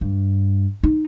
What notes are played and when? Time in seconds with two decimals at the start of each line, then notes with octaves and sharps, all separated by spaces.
0.01 G2
0.83 D#4